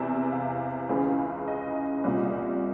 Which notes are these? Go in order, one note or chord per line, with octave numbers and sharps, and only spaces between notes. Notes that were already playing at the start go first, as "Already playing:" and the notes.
Already playing: E2 C3 E3 E5
F5
C#2 C#3 E3
D#5
C2 A#2